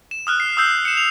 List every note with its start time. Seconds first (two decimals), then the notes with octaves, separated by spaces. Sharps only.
0.11 E7
0.27 D#6 F6 F#6
0.40 C7
0.57 D#6 E6 G6 C7
0.85 C#7 E7
0.97 F7